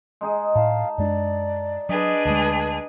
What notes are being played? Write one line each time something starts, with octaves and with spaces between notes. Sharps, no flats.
G#3 D#4 G#4
A2 F5 A5
F#2 G#3 D4 D5
F#3 D4 G#4 B4 D#5
D2 G#3 A5